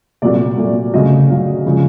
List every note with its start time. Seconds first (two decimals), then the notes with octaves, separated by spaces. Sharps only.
0.22 C2 A#2 F#3 A3 D5
0.58 C2 A#2 F#3 A3
0.93 D2 C#3 F#3 D#5
1.29 D2 C#3 F#3 F5
1.66 C#3 F3 G#3